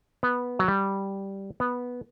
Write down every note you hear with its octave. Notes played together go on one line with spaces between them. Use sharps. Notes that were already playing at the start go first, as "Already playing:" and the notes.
B3
F#3
G3
B3